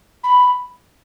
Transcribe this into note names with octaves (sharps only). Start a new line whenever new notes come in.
B5